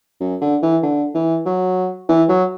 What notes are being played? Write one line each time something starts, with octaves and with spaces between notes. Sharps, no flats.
F#2
D3
E3
D3
E3
F#3
E3
F#3